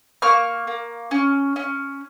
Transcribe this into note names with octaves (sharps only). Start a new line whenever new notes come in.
A#3 C#6 F6
A#3
C#4
C#4